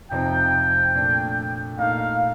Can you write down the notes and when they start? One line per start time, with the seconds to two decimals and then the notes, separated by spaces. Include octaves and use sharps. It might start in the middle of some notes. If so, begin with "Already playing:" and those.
0.11 F2 C3 F3 C4 D#4 G5
0.95 A#2 A3 D4
1.78 A#2 A3 D#4 F5